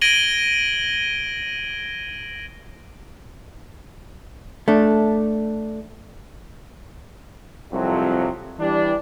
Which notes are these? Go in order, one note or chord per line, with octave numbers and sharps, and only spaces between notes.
G#6 A#6 D7 D#7 F#7 G7
A3 D4
C2 F2 C3 F#3
E3 G3 D4